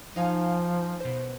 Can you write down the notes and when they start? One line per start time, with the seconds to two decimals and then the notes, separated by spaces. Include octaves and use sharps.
0.16 F3 D#4 F5 G#5
1.00 B2 C5